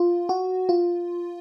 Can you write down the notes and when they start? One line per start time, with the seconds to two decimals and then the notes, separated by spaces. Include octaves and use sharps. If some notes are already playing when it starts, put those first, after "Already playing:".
Already playing: F4
0.29 F#4
0.69 F4